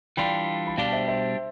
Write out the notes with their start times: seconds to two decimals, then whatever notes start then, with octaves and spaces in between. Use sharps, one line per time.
0.17 E3 G3 D4 F4 G5 B5
0.67 B5
0.78 B2 G3 D4 G4 F5 A5
0.92 C5 E5
1.08 C5 E5